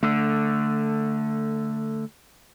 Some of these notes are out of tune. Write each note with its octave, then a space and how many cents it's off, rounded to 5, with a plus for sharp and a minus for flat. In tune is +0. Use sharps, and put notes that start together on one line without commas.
D3 +0 A3 +10